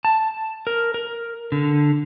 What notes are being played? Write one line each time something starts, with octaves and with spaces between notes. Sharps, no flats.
A5
A#4
A#4
D3